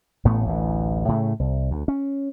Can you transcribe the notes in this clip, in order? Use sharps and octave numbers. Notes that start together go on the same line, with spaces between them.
A1 A2 A3 B3
A1 D2 E3
A2 C#3 G#3 A3
C2
D2
C#4